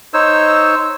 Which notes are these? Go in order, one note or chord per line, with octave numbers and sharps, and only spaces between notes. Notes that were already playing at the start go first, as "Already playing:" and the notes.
D#4 C5 C#5 E6